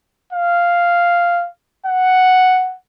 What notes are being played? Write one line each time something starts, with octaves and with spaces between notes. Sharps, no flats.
F5
F#5